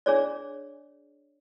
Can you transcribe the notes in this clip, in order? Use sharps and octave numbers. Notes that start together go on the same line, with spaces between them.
D4 G#4 C#5 D5